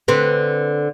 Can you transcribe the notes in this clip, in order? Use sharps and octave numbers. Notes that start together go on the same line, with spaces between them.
D3 C4 B4